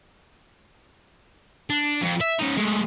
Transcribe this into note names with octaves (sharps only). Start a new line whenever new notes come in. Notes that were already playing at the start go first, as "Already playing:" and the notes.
D4
F2
E5
C#4 D#4
G#3 A3